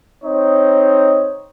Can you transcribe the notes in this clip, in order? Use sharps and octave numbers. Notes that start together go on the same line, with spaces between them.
C4 D#4 C#5 D#5